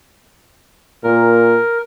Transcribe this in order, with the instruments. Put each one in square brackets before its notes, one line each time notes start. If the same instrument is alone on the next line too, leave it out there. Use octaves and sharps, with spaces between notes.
[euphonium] A#2 [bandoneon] A#4